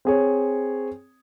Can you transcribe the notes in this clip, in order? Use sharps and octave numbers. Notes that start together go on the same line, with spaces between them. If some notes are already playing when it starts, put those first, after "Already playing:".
C4 G#4 C#5